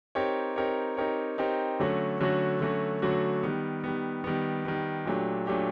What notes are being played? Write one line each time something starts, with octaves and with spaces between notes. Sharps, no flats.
C4 D#4 G4 A#4 C#5
C4 D#4 G4 A#4 C#5
C4 D#4 G4 A#4 C#5
C4 D#4 G4 A#4 C#5
D3 F#3 A3 C#4 F#4
D3 F#3 A3 C#4 F#4
D3 F#3 A3 C#4 F#4
D3 F#3 A3 C#4 F#4
D#3 G3 B3
D#3 G3 B3
D#3 G3 B3
D#3 G3 B3
A#2 F#3 A3 D4 G4
A#2 F#3 A3 D4 G4